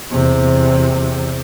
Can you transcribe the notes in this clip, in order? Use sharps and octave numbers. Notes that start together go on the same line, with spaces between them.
E2 C3